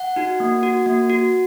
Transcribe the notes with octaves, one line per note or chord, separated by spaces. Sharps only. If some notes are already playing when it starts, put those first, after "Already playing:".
Already playing: F#5
D#4 F#4
A#3
F#4
A#3
F#4